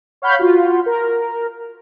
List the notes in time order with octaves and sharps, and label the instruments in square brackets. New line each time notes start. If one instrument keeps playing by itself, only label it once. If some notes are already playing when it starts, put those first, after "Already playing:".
[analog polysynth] C#5 F5 F#5 B5 G6
F4 F#4
A#4